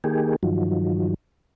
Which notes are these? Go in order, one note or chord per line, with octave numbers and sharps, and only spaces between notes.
D#3 A#3 G4 G#4
G2 D#3 F3 F#3